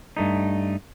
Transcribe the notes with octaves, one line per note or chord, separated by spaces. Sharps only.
G2 A3 D#4